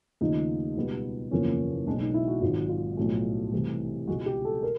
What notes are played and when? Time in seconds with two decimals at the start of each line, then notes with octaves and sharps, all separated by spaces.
0.21 D#2 C#3 F3 A3 D#4
0.76 C#2 B2 G3 B3
1.31 F#1 E2 C#3 F3 A#3 C#4
1.87 B1 B2 G#3 D4
2.00 D#4
2.14 E4
2.28 F#4
2.41 G#1 G#2 D#3 F#3 F4
2.69 F4
2.97 B1 A2 F3 A3
3.52 C2 C3 E3 A3
4.08 C#2 B2 G#3 F#4
4.26 G4
4.45 A4
4.63 A#4